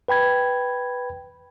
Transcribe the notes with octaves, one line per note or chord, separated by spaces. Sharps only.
B4 G5 B5 G#6